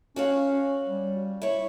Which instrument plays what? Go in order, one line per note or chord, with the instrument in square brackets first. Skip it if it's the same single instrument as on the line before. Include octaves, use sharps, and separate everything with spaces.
[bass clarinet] C#4 [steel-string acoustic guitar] F#4 C#5 F5
[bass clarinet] G3
[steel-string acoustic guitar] E4 C#5